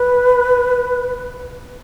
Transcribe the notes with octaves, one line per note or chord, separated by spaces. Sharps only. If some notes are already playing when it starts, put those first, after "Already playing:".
Already playing: B4